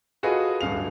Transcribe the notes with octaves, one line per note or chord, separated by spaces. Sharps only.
F4 F#4 G#4 A4 B4 D#5
D1 G2 F5 F7